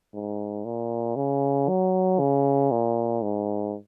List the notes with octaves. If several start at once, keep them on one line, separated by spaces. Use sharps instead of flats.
G#2
A#2
C#3
F#3
C#3
A#2
G#2